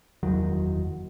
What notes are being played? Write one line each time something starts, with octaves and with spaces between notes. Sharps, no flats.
F#1 E2 D#3 F#3